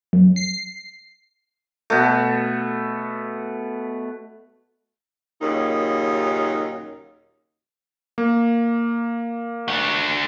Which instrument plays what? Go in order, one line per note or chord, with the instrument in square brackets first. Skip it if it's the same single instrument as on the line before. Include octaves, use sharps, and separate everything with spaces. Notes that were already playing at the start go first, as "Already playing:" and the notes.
[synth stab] F#2
C7
[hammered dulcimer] B2 A3
[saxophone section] D#2 A#2 C#3 F#3 D#4
[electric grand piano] A#3
[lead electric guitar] D4 F#4